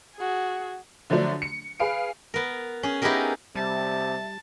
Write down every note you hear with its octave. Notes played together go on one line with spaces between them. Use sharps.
F#4 G#4
D3 F3 F#3 A3 D4
C#7
G#4 B4 F5 D7
B3 A#4
C#4 G#4
B3 D#4 E4 G4 G#4 A#4
C3 G3 E5 A5